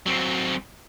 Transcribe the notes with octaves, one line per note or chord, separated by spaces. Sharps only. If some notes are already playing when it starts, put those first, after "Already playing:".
F#3 C4